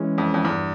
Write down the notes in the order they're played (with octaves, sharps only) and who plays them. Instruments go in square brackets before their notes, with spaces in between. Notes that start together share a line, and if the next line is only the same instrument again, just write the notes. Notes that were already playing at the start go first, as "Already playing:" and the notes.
Already playing: [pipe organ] E3 G#3 C#4
[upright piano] F2
F2
[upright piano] E2 [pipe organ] G2